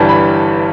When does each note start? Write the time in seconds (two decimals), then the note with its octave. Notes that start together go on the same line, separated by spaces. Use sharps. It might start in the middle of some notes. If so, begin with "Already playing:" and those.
Already playing: G1 G2 E3 G3 A5
0.09 B5